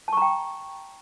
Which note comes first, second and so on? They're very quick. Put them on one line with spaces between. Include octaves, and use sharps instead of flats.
A5 C#6 A#5 G5